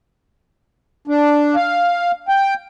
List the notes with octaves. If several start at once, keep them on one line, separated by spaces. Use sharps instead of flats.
D4
F5
G5